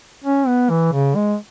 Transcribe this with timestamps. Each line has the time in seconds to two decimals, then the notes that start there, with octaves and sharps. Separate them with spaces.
0.24 C#4
0.47 B3
0.70 E3
0.93 C#3
1.15 G#3